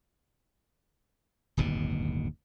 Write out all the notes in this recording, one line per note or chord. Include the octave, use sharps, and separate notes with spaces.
D1 G1 D#2 B2